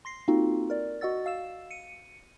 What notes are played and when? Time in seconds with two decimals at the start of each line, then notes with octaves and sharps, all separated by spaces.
0.05 C6 A#6 C7
0.28 A#3 C4 D#4 F4 F#4 A4
0.70 A#4 D5
1.01 F#4 D#5 F#5 E6 A6
1.26 F5 E6 E7
1.71 C#7 D#7